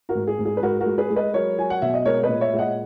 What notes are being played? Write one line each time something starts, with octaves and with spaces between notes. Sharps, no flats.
F#4 A#4
G#2
G#4
G#2
G#4
B4
G#3 F#4 A#4
F#4 A#4
G#3
G#4 B4
G#3
B4 D#5
F#3 A#4 C#5
F#3 G#5
F#5
B2 E5
D#5
G#3 A#4 C#5
B4 D#5
A#2
C#5 E5
G#3 E5
D#5 F#5